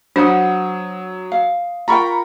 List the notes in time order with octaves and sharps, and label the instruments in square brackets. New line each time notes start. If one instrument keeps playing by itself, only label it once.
[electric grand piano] F#3 D#6 [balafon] D4 [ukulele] C5 F#5
[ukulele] F5
[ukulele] F4 A#4 G5 [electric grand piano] A#5 B5 C#6